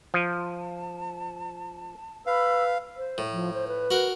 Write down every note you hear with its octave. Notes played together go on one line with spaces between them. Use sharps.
F3 A5
B4 F5 B5 E6
C5
A2
F3
C5
B4
F#4 A#4